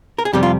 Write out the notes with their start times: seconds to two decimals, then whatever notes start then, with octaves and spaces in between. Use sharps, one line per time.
0.18 A#4
0.25 G#4
0.33 F2 C3 G3 G4
0.43 F4